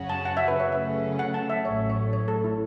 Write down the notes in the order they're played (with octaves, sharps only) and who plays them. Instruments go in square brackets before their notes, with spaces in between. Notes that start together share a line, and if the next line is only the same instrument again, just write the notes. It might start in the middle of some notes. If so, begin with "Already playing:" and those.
Already playing: [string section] F#2 C#3 F#3 C#4 F#4
[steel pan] A5
F#5
E5
B4
C#5
[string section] C#3 F#3 A3 C#4 [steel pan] E5
[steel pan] F#5
A5
E5
[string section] A1 A2 F#3 A3 [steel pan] C#5
[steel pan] C#5
C#5
A4
E4